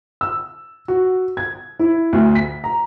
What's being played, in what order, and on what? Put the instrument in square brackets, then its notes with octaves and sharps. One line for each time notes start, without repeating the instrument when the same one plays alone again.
[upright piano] E6
F#4
G#6
E4
D2
B6
A#5